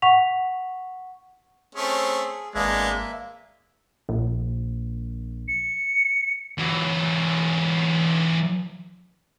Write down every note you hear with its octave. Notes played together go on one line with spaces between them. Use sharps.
F#5 C#6 B6 F7
A3 C4 C#4 G#4
G#1 G#3 A#3 B3 D4 E5
A#1
C#7
E3 F#3